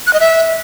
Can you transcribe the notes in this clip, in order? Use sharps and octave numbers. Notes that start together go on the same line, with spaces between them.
F#6
D#5
E5